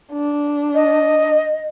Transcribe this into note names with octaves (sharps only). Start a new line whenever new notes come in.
D4
D#5